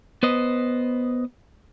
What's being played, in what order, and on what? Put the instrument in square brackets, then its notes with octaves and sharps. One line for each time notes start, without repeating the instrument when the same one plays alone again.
[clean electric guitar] B3 B4 C5 D#5